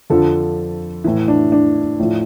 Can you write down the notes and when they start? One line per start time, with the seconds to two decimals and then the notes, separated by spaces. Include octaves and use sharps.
0.10 F2 D3 F3 A4
1.04 A2 E3
1.28 D4
1.52 D4
1.99 A2 F3